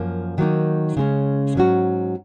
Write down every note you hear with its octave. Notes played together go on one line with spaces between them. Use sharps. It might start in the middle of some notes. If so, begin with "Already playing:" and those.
Already playing: F#2 F3 A#3
D#3 F#3 A#3 D#4
C#3 G#3 C#4
G#2 F#3 C#4 F#4